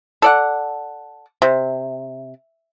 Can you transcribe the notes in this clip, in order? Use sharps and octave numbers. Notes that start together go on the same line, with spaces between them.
A4 D5 F#5
C3